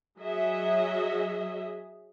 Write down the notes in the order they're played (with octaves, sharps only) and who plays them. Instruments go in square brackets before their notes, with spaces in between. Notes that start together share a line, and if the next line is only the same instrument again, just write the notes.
[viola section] F#3 G#4 D#5 E5